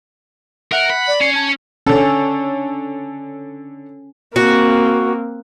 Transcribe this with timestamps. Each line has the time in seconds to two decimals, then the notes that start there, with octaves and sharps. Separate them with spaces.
0.72 A#4 E5 F#5
0.90 B5
1.08 D5
1.21 C#4 C7
1.35 A5 G#6
1.87 D3 C#4 A4
4.36 A#3 C4 F#4